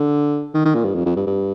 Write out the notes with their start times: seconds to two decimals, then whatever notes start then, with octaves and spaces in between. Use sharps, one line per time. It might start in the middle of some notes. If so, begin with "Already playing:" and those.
Already playing: D3
0.54 D#3
0.65 D#3
0.74 A#2
0.85 G2
0.95 F2
1.06 F2
1.16 G2
1.27 G2